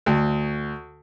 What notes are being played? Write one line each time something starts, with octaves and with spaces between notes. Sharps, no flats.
D2